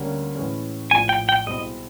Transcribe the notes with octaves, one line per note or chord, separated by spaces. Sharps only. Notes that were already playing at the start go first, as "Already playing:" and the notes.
Already playing: D2 D3 G3 A#3 C#4
A2 E3 G#3 C#4
A#1 A2 F3 G#5
G5
G5
C2 B2 G#3 C4 E4 D#5